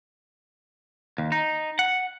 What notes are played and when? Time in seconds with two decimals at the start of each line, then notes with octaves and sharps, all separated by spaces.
1.18 D#2
1.32 D#4
1.79 F#5